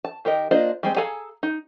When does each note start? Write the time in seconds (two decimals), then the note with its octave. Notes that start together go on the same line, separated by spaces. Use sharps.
0.04 A5
0.25 D#3 G4 A#4 D#5
0.51 A#3 D4 F4 C5 D#5
0.83 G3 G#3 C4
0.96 G#4 A4 F5 G#5 A#5
1.43 D#4